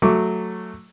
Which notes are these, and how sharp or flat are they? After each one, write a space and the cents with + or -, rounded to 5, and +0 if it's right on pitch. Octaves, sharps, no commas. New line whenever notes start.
F#3 -5 A3 +0 D6 -20